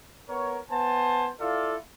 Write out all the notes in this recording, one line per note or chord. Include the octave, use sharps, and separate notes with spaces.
B3 A#4 C#5
B3 C5 G#5 A5
E4 F4 A4 D5 F5